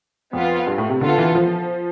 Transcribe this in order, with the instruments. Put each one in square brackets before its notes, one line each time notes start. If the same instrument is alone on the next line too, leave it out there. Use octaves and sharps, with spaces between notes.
[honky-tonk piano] F2 [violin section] B3 F4 B4
[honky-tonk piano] G2
A2
C3
[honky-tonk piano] D3 [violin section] B3 F4 A4
[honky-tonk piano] E3
F3